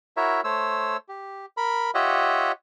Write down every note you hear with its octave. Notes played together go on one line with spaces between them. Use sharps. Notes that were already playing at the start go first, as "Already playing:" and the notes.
E4 F#4 A#4 C#5 E5
A3 C5 C#5 E6
G4
A#4 B5
F4 G4 C#5 D#5 E5 F#5